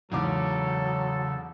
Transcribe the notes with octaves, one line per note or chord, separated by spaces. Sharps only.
E2 G#2 C#3 F#3 A4 D6